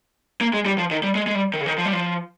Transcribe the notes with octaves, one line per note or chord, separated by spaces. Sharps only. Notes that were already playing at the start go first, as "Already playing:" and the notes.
A#3
G#3
G3
F3
D#3
G3
G#3
G#3
G3
D#3
C#3
D#3
F3
G3
F3